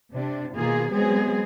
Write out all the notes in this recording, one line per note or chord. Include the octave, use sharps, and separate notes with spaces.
C3 D4
B2 D#3 A#3 F4 G#4
F#3 G#3 B3 C4 G#4